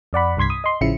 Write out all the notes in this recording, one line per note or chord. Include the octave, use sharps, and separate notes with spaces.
F2 D5 F#5 B5
C2 G2 C6 G#6 B6
D#6
D#5 C6
A1 C#3 F3 E4 C#7